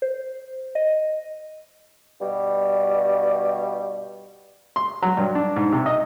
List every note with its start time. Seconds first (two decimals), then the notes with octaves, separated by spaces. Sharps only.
0.02 C5
0.75 D#5
2.21 G2 B2 G3
4.76 C6
5.02 F#3
5.17 G2
5.35 D4
5.56 G#2
5.72 C3
5.86 D#5